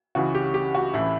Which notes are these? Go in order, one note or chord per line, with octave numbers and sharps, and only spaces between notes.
C#2 C#3 E3 F#4
G4
G4
F#4
A1 A2 E3 E4